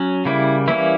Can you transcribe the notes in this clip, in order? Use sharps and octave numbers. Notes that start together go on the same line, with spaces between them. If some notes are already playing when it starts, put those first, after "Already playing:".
Already playing: F#3 C#4
C#3 G3 A#3 E4
E3 G3 A#3 C#4 E4